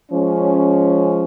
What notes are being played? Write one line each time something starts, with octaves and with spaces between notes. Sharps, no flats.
F3 G#3 C#4